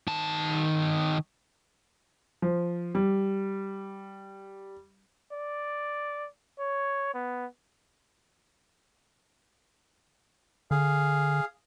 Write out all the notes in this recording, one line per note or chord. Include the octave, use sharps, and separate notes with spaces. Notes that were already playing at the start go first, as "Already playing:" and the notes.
D#3 A5
F3
G3
D5
C#5
B3
D3 G#4 F5